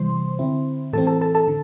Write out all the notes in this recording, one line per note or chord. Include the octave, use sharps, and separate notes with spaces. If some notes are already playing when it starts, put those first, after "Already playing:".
Already playing: C3 E3 G3 C5 C6
D3 C4 E4
A2 E3 C4 A4 A5
A4 A5
A4 A5
A4 A5
D3